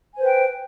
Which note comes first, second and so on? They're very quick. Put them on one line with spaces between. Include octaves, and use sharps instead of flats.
G#5 C5 B4 G5